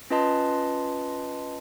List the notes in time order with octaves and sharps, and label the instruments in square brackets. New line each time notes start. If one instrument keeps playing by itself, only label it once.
[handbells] C#4 F4 B4 D#5 A5 C6